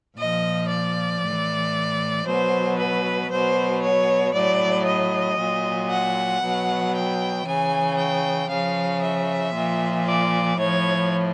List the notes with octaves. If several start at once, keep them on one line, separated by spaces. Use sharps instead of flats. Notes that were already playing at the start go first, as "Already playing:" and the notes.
A#2 F3 D#5
D5
A2 E3
B2 F#3 C5
B4
B2 F#3 C5
C#5
A2 F#3 D5
D#5
A#2 F#3
F#5
B2 F#3
G5
C#3 E3 G#5
G5
C#3 F3 F5
E5
A#2 F3
D5
A2 F3 C#5